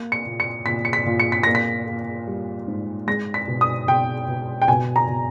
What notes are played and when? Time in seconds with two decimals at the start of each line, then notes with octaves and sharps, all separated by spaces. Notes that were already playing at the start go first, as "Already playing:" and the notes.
Already playing: A#3
0.12 C#7
0.26 A#2
0.40 C#7
0.66 A#2 B6
0.85 C#7
0.93 B6
1.06 A#2
1.20 C#7
1.32 B6
1.43 A#3 A#6
1.55 B6
1.87 A#3
2.27 G3
2.68 G#2
3.07 G#3 A#6
3.34 B6
3.48 B2
3.61 D#6
3.88 B2 G5
4.28 B2
4.62 G5
4.68 B2 G#5
4.96 A#5
5.08 B2